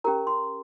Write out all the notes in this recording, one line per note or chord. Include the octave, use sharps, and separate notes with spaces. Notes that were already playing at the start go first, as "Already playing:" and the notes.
C#4 G4 A#4 A#5
C6